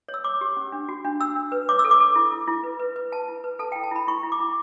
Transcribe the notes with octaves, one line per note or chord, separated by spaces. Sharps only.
C#5
E6
C#5 D6
G4
C#4
D4
F#4
D4
D4 E6
D4
B4
C#5 D6
E6
A4
D6
A4
E4
E4
E4
B4
B4
B4
B4 A5
E4
B4
A4 A5
G5
E4
A5
E4 B5
E4 C#6
E4
D6
E4